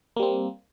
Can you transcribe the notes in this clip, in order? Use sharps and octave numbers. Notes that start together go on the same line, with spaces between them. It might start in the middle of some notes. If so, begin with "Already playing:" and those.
G3 A#3 C4